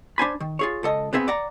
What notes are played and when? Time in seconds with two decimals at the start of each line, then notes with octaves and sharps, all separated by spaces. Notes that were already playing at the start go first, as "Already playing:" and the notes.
0.18 D4 C5 G#5 B5
0.40 D#3
0.59 F4 G#4 C#5
0.83 C#2 A4 D#5
1.13 B3 C4 G#4 E5
1.28 D5 F#5 A#5